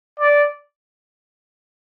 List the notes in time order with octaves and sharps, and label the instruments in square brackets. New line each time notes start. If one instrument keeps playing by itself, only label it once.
[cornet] D5